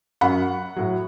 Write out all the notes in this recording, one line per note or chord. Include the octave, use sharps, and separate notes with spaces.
F#2 F#3 F#5 B5
A2 F#3